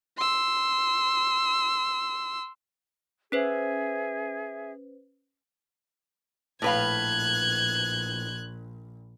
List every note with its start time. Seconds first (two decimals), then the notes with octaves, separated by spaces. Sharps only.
0.17 C6 E6
3.32 C#4 G#4 B4 C5 E5
6.62 A#1 A2 B4 F5 F#6 G#6